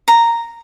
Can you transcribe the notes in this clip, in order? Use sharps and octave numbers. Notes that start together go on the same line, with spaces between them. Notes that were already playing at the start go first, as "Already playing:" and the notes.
A#5